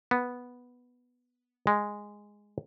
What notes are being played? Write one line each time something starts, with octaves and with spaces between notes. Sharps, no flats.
B3
G#3